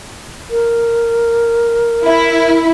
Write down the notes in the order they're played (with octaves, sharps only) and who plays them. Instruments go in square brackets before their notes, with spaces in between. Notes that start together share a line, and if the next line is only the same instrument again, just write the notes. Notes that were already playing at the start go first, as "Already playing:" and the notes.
[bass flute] A#4
[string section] E4